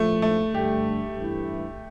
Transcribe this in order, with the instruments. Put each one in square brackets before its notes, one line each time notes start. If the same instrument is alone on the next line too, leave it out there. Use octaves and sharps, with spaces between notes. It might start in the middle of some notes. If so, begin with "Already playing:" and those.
Already playing: [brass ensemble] A#1 A2 F3 [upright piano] A3
[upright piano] A3
[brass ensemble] G2 D3 A3 [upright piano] G4
[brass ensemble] G2 E3 A3 E4